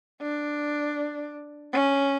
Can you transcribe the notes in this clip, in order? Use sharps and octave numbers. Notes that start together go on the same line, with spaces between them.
D4
C#4